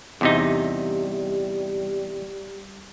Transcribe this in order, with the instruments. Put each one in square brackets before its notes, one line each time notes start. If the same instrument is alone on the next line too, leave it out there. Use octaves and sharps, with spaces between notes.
[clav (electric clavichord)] E2 C3 D#4 [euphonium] G3